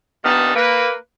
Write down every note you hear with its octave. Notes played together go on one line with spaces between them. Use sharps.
G2 A#2 D#3 B3 D#4 A5
A#3 B4